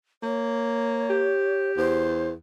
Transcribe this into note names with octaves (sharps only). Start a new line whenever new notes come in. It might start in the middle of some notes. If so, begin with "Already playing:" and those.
A#3 C#5
G4
E2 C5